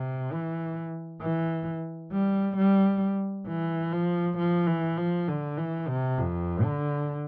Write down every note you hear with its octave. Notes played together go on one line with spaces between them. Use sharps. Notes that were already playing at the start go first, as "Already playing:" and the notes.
Already playing: C3
E3
E3
G3
G3
E3
F3
F3
E3
F3
D3
E3
C3
F2
D3